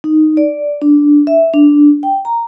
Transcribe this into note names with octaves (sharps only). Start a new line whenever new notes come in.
D#4
D5
D4
E5
D4
G5
A#5